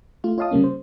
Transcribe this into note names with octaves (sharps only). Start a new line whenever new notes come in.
A3 F4
F4 C#5 D#5 F5 A5 D#6
C#3 G3 A#3 C#4
C5